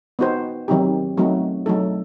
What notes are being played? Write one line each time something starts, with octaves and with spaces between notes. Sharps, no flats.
B3 D#4 F#4 C5
D#3 F#3 C4 D#4 G4
F#3 A3 C4 D#4 F#4
F#3 A3 D#4 A4